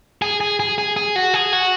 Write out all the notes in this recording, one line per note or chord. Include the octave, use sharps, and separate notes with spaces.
G#4
G#4
G#4
G#4
G#4
F#4
G#4
F#4